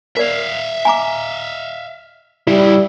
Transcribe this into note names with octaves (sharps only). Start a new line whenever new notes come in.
A#4 D5 E5 F5
G#5 A#5 D6
G2 C#3 G3 E4